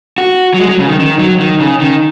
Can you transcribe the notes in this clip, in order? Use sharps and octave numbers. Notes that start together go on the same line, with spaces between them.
F#4
F#3
G#3
F#3
C#3
D#3
D#3
F#3
D#3
C#3
D#3